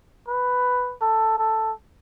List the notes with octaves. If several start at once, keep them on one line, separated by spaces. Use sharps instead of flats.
B4
A4
A4